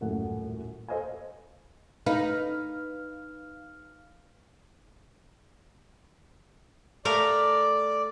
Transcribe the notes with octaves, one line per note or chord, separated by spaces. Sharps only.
D#1 F#2 A2 A4 F#5
A4 C5 D#5 F5 G#5
D#4 B4 F5 F6
A3 A#4 D5 F5